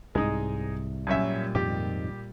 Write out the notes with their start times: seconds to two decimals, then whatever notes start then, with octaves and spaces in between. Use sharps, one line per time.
0.15 C2 G#2 G#3 D#4
1.07 F#2 A#2 G3 C#4 E5
1.55 F2 G#2 D#3 G4